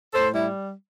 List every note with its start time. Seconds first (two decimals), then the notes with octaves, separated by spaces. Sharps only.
0.14 A2 A4 C5
0.33 G3 E4